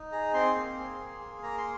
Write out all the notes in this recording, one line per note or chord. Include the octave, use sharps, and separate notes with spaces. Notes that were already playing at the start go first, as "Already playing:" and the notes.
Already playing: D#4
G#4 A#5
C4 C6
A#3
G#4
A#3
G#4
A#3 A#5
C6